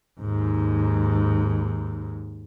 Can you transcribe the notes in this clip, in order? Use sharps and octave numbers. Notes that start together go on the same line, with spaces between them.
D#2 G#2